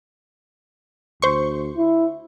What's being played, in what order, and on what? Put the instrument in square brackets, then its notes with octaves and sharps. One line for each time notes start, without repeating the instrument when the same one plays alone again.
[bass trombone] D2 [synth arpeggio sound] C5 C#6
[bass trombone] E4